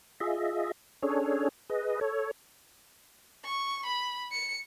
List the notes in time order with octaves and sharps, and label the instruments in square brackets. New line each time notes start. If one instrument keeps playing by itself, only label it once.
[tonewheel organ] F4 G#4 D#5 E5
C#4 D4 G#4 A4 C#5
G#4 B4 D#5
A4 C#5
[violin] C#6
B5
C#7